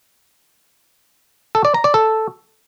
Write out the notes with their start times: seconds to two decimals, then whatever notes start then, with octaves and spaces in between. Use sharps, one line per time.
1.55 A4
1.65 D5
1.74 A#5
1.84 D5
1.94 A4